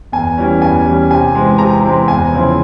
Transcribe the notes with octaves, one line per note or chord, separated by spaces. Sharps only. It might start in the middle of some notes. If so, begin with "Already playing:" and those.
E2 G#5
E3 G3 C#4
E2 G#5
E3 G3 C#4
C3 G#5
E3 G#3 C4
C3 A#5
E3 G#3 C4
E2 G#5
C#3 F3 C4 E4